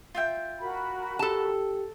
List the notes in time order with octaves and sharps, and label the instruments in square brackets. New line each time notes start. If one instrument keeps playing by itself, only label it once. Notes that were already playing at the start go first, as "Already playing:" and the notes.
[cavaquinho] F4 E5 G5
[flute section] F#4 A#4 B5
[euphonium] G4 [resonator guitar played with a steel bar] A4 A5